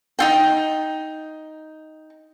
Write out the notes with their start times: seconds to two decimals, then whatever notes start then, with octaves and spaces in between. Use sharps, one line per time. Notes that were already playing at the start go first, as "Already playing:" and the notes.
0.19 D#4 F4 G5